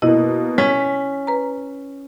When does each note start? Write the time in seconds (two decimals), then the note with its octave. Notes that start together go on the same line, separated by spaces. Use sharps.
0.02 B2 A#3 E4 D#5
0.58 C#4 B6
1.27 B4 A#5